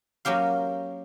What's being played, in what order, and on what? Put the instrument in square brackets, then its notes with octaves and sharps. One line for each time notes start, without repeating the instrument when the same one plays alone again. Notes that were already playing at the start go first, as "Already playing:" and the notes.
[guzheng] F#3 A#3 C#4 G4 F5